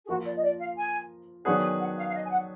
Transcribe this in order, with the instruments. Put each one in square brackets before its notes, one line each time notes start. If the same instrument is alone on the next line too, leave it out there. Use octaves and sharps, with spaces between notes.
[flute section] G#4
[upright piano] F3 A#3 F4 A#4 [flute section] F#4
[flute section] D5
D#5
D5
F5
G#5
[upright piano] D#3 F#3 B3 D4 G#4 [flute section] F#5
[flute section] G#5
F#5
F5
F5
D#5
G#5
F#5